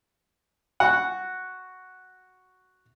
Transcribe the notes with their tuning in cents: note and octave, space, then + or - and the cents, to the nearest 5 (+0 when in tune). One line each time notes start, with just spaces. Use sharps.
F#4 +0 F#5 +0